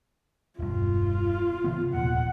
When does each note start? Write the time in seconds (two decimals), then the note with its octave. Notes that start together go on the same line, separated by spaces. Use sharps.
0.59 E1 G2 F4
1.64 C3 E3 B3
1.94 D#1 F2 A#2 F#5